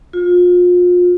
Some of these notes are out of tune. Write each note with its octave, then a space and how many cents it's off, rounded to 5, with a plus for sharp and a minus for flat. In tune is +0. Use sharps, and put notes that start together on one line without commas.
F4 +35